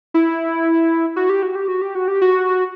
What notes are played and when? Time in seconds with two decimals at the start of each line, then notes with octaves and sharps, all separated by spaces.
0.14 E4
1.16 F#4
1.29 G4
1.43 F#4
1.55 G4
1.68 F#4
1.82 G4
1.95 F#4
2.08 G4
2.22 F#4